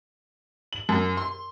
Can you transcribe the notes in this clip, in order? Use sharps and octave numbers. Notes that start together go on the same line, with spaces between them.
F#7
F#2
C6